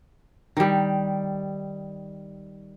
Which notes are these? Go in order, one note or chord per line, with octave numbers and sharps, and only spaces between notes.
D#3 G3